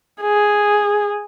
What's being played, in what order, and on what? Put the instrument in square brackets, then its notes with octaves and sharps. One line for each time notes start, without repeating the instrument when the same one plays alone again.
[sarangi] G#4